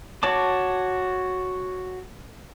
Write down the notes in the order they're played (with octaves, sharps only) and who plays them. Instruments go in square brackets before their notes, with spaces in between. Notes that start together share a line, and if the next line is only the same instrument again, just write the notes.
[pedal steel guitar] F#4 C#5 A5 D6